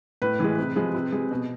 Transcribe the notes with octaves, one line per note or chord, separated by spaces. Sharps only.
A2 B4
E3 G#3
C3
F3 G#3
C3
G#3
B2